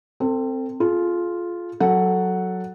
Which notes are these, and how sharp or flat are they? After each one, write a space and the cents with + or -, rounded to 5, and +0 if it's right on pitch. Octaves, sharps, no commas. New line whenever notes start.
C4 +0 A4 +35
F4 +0 G#4 +40
F#3 +0 A4 +0 F#5 +0